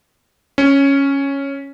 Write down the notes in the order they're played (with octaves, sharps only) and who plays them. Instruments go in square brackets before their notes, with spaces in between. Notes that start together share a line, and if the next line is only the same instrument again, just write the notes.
[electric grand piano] C#4